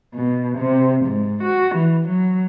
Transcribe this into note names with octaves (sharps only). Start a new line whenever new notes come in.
B2
C3
G#2
F#4
E3
F#3